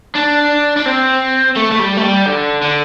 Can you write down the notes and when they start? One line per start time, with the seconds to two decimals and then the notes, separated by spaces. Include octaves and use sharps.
0.15 D4
0.77 D4
0.86 C4
1.56 A3
1.72 A3
1.80 G3
1.97 A3
2.03 G3
2.26 D3
2.62 D3